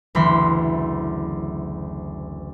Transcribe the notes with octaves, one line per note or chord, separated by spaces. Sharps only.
F#1 D2 E3 B5 C6